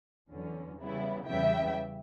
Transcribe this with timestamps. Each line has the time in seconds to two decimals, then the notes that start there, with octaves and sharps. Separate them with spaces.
0.29 E2 D3 F#3 C#4
0.78 C#3 G3 B3 E4
1.27 E2 C#3 G3 B3 E5 G5